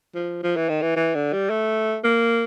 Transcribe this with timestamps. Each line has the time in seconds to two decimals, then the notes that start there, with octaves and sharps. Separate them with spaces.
0.15 F3
0.43 F3
0.56 E3
0.69 D#3
0.82 E3
0.96 E3
1.15 D3
1.33 G3
1.50 A3
2.04 A#3